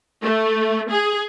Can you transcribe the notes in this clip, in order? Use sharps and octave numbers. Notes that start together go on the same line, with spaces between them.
A3
G#4